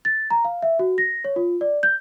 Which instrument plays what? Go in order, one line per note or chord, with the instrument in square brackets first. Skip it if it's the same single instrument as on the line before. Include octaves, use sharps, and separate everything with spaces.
[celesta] A6
A#5
F5
E5
F#4
A#6
C#5
F4
D5
G6